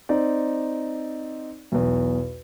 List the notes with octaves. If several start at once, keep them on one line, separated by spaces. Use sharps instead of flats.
C4 D#4 D5
B1 E2